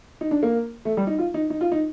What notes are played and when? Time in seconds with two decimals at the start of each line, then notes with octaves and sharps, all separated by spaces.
0.21 D#4
0.31 D4
0.43 A#3
0.85 A3
0.97 G3
1.07 D#4
1.18 F4
1.34 D#4
1.50 D#4
1.61 F4
1.72 D#4